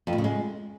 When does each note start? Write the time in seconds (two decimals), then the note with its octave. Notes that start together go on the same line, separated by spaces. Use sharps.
0.07 F2
0.13 A2
0.18 C#3
0.24 G#3